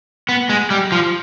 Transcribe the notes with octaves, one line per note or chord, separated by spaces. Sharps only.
B3
G#3
G3
F3